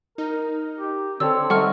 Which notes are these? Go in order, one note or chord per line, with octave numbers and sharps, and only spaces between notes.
D#4 A#4
G4
D3 C4 A4 C#5 D5 E6
G3 A3 D#4 F#5 C#6 F6